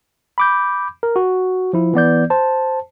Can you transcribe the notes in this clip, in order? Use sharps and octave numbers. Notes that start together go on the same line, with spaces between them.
B5 D6 G6
A#4
F#4
F3 E4
E3 B3 D5 G6
C5 A5